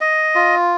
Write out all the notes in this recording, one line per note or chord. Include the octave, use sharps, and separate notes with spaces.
D#5
F4